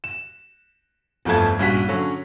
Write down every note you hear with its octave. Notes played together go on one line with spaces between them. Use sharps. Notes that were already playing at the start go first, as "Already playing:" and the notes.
E7
G1 F2 F3 A3 A5 G#6
A#1 G2 C#4 F#4 B6
D3 F#3 C#4